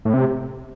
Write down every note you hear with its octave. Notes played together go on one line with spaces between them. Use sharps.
A2
C3